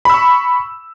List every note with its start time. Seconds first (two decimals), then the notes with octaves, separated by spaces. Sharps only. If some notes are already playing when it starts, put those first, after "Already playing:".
0.05 B5
0.10 E6
0.14 C#6